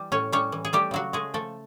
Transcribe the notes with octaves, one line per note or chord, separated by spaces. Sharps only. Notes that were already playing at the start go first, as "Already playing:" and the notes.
Already playing: E3 G3
A2 C#4 C#5
G3 C#4 C#5
E3
G#4
G3 A3 G4
C#3 F#3 F#4
G#3 A3 G#4
F3 A3 A4